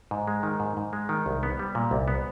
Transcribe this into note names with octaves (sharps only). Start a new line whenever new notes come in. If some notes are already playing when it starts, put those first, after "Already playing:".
G#2
G#3
D#3
G#2
G#2
G#3
D#3
C2
B3
G3
A#2
C2
B3